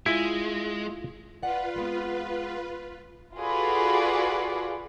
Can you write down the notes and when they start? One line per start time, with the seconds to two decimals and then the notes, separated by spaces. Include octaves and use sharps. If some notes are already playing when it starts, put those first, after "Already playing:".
0.06 G#3 E4 F4
1.43 F4 B4 D5 F#5
1.76 G#3 B3 C4
3.38 F4 F#4 G#4 A4 B4 D5